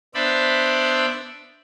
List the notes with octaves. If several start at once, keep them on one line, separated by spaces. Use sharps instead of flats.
B3 D4 C5 D5 E5 B5